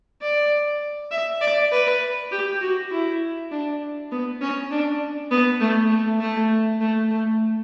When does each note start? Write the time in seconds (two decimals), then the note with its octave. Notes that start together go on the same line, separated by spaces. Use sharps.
0.22 D5
1.11 E5
1.41 D5
1.72 B4
2.31 G4
2.61 F#4
2.92 E4
3.51 D4
4.11 B3
4.41 C#4
4.71 D4
5.31 B3
5.61 A3
5.90 A3
6.20 A3
6.80 A3
7.10 A3